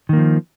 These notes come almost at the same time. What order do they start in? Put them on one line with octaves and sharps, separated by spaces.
D#3 A#3 F3